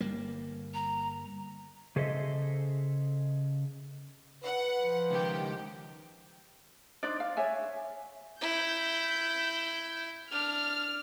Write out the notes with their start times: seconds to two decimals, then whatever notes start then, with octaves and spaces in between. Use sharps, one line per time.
0.01 G1 G3 A#3
0.74 A#5
1.96 C#3 G#4 A4 C5 D#5 E5
4.44 B4 F#5
4.80 F3
5.10 C#2 D#3 G4 G5
7.03 D4 D#4 C5 D5
7.20 F5
7.37 C#5 E5 G#5
8.41 E4 G6
10.31 D4 F6